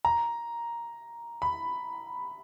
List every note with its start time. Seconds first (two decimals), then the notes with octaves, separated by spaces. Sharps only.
0.05 A#5
1.42 B5